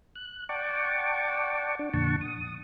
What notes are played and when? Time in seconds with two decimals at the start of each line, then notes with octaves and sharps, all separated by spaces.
0.15 F#6
0.49 D5 F#5 G5 A5 C#6 D6
1.79 D4
1.94 F2 A#2 D3 F#5 A5 C#6
2.21 D#6